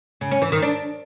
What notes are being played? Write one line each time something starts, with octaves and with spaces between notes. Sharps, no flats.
C#3
C#4
E3
D#3
D4